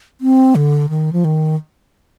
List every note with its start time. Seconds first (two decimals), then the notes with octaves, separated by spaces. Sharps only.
0.21 C4
0.55 D3
0.89 D#3
1.13 F3
1.25 D#3